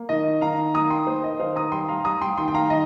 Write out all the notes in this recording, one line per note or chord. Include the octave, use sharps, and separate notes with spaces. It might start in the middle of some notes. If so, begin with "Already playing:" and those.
Already playing: A#3
D#3 D#5
D#3 F5 A#5
A#3 A#5 D#6
G5 C6
A#3 C5
D#5
D#3 C5 F5
A#5 D#6
G3 G5 C6
F5 A#5
G3 A#5 D#6
G5 C6
D#3 G5 C6
G5
F5 A#5
D#3 D#5